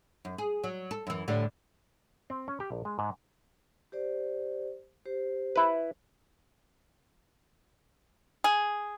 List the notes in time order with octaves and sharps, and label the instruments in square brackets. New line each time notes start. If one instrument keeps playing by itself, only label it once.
[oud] F#2
G#4
F#3
A4
F#2 E3
A2 D3 G3
[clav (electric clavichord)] C4
C#4
G4
A#1
G#3
G#2
[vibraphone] G4 C5 D5
G4 C5
[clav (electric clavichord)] E4 B4
[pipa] G#4